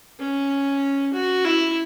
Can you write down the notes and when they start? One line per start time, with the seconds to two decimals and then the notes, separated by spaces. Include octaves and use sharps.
0.20 C#4
1.14 F#4
1.45 E4